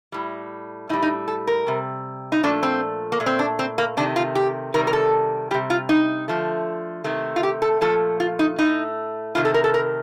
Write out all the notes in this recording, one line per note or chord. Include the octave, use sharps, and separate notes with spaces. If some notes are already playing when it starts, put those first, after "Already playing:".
A2 G3
A2 G3 D#4
D#4
A4
A#4
C3 G3
D#4
A#2 F3 A3 D4
C4
A#3
A#2 A3
C4
D4
C4
A#3
C3 D#3 A3 D4
F4
G4
C3 D#3 G3 A#4
A#4
A4
C3 G3 G4
F4
D#4
D3 F3 A3
C3 D#3 A3
F4
G4
A4
A#2 F3 A3 A4
F4
D#4
A2 A3 D#4
C3 D#3 A3 F4
A4
A#4
A4
A#4